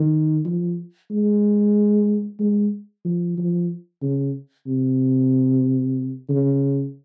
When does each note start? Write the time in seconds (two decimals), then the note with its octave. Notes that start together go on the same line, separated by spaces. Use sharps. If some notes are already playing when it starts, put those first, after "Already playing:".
Already playing: D#3
0.45 F3
1.10 G#3
2.40 G#3
3.05 F3
3.38 F3
4.02 C#3
4.67 C3
6.29 C#3